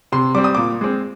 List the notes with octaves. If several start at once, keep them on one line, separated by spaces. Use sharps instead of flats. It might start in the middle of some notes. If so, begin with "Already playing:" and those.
C3 C6
G3 C4 D6
D#6
A#2 D6
G#3 C4